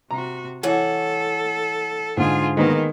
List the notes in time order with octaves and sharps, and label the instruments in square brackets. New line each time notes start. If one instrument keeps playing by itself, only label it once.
[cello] C3 F#4 [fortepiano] A#5
[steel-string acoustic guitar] E3 C#5 F#5 [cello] A4
[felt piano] G#2 D3 [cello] F4 G#4
[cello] D#3 [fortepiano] G#3 A#3 B3